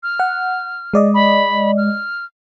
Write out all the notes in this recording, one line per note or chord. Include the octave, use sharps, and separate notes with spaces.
F6
F#5
G#3 D5 D#5
B5
F6